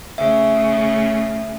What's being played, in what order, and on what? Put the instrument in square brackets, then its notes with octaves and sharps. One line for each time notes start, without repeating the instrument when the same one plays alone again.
[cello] C#3 A3 [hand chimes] E5